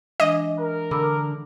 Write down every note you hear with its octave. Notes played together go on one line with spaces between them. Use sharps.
E3 G#3 D4 D#5
A#4
D3 B5 D6 E6